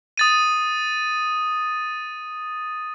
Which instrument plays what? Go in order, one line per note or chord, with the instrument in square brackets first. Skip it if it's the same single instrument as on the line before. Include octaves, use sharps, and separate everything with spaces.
[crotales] D#6 A6 D#7